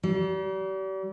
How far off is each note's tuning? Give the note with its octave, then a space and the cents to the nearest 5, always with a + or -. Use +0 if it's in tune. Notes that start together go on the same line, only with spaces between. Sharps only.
G3 -40